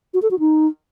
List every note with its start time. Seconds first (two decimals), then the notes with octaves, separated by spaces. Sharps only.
0.14 F#4
0.22 A4
0.31 F#4
0.39 D#4